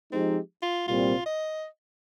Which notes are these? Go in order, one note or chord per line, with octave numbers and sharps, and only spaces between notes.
F3 G#3 C4 D#4 G4
F4
C2 A#2 G3 C4 F4
D#5